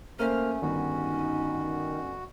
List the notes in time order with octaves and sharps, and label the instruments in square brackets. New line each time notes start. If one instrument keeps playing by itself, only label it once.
[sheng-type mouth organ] A3 [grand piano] A#3 A#4 C5 [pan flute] C#4 [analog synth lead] F6
[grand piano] G1 [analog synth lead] D#3 [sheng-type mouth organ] F#4